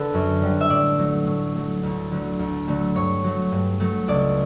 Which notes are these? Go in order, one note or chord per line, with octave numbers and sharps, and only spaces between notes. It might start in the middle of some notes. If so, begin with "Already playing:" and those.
Already playing: D3 A4 B4
F#2
D3 G3
E5
A2 D5
F#3 A3
A2
F#3 A3
D2
D3 F#3 A3
D2
D3 F#3 A3
G2 C#5
F#3 A3
G2
F#3 A3
C#2 D5